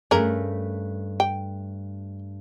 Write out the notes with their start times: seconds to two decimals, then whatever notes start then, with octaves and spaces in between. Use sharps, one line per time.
0.11 G2 A3 C#4 G#4 A#4
1.20 G5